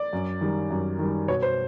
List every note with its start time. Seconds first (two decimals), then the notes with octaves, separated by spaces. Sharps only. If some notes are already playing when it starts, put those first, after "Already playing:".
Already playing: D5
0.13 F#2
0.41 D#3 G3
0.71 F#2
0.99 D#3 G3
1.28 B2 C#5
1.42 C5